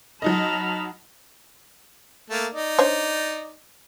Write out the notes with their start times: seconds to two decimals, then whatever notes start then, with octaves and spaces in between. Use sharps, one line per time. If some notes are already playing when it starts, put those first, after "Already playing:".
0.22 F#3 D#4 D#5 A5 B5 F6
2.30 A3 A#3
2.53 D#4 D5
2.79 D4 C5 C#5